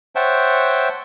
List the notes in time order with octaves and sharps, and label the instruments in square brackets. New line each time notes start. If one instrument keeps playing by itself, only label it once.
[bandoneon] C5 C#5 E5 F#5 G5 A5